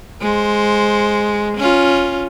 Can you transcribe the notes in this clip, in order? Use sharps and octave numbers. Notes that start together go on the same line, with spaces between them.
G#3 C5
C#4 F4